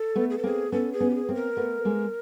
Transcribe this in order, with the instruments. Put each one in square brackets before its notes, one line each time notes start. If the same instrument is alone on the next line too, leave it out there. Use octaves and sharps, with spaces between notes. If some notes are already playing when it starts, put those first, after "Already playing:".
Already playing: [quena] A4
[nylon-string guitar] A3 B3
[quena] G#4
A4
[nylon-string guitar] A#3 C4 [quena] G#4
[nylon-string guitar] B3 C#4 [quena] A4
[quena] G#4
[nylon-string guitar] B3 C#4
[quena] G4
G#4
[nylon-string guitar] A#3 C4
[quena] A#4
[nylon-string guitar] A3 B3
G#3 A#3